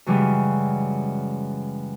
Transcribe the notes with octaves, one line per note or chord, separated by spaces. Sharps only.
F#2 C#3 E3 G3 G#3